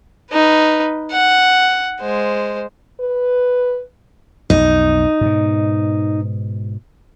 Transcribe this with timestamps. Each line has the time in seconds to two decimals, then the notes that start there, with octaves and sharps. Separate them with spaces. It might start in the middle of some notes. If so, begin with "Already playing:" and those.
0.32 D#4 B4
1.11 F#5
2.01 G#3 C5
3.00 B4
4.50 B1 F2 D#4
5.21 G#2 B2